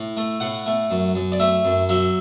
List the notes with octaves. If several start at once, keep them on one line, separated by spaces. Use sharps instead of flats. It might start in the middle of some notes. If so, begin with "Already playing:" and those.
Already playing: A2
A3
A2 F#5
A3
F#2
F#2
D5
A3 E5
F#2
F#3 E5